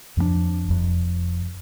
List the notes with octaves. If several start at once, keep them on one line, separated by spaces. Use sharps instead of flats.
F2 F3 F#3 D4
F1 F2